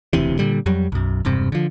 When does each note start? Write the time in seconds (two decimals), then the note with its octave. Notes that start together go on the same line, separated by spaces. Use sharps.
0.13 E1 D2 C3 E3
0.39 A#2 D3 G3
0.66 F2 F#3 G3
0.92 B1 F#2
1.25 E1 G2 C3
1.52 D3 F3